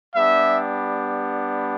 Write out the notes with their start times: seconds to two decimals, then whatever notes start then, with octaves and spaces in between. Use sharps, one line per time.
0.15 G3 B3 D4 G4 E5